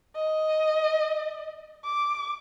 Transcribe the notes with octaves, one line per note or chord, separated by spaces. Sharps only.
D#5
D6